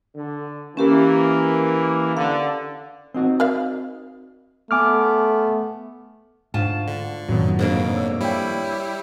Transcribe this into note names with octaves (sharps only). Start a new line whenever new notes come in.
D3
E3 A#3 C#4 G4 A#4
D3 F5
C4 D#4 F#4
A#4 D5 F5
A3 B3 G#5 D6 F6
D2 G#2 F4 A5
D3
F#2 A2 D#3 F#3 B3
F2 G#2 B2 A#3 D4
C#5 E6
G3 E4 C#5 G5